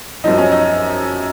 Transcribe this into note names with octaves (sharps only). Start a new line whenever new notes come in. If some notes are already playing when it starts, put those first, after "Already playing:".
F#2 F3 D#4
C#4
D#4